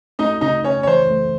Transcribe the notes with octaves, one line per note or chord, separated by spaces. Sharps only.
A3 D#4 D#5
C#3 D#4 D#5
C#3 C#4 C#5
C#5
E3 C5
A3